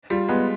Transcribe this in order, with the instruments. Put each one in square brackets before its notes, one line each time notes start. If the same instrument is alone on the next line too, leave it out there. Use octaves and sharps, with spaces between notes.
[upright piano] G3 [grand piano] F4
[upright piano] G#3 [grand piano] B3